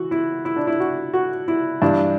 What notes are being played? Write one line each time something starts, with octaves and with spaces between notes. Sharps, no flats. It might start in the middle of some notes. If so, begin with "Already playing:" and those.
Already playing: E3 F#4
E4
E4
D4
E4
F#4
F#4
E4
G2 E3 D4